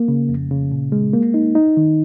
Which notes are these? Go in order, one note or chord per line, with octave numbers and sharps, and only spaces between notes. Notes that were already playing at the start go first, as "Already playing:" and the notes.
Already playing: A#3
C#3
F2
C#3
A#2
G#3
A#3
D#4
D#4
D#3